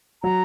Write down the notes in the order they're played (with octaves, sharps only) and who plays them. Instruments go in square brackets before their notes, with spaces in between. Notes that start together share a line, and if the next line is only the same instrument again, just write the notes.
[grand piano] F#3 [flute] A#5